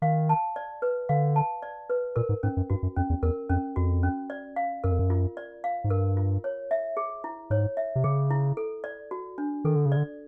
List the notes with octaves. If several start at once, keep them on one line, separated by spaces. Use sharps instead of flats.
D#3 F5
A5
D5
B4
D3 F5
A5
D5
B4
A#2 A#4
G#2
G#2 C#4
F#2
G2 F#4
F#2
F2 C#4
E2
E2 A#4
F2 C#4
F2 F#4
C#4
D5
F5
F#2 A#4
F2
F#2
F4
D5
F5
G#2
G2 A#4
F4
C#5
E5
G#4
E4
G#2 C#5
E5
C3
C#3 G#4
E4
A4
D5
F#4
D4
D#3 A4
D3
C#3
D3 D5